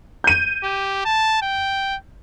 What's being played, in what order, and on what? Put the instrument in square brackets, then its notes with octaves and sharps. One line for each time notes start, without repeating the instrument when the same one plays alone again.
[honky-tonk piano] G6 D#7
[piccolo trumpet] G4
A5
G5